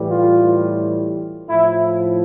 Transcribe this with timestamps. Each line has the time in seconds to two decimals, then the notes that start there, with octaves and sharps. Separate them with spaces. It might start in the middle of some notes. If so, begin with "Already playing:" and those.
Already playing: A2 E3 G3
0.09 F4
1.49 A2 F3 E4